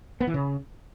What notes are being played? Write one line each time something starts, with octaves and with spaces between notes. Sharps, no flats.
B3
E3
C#3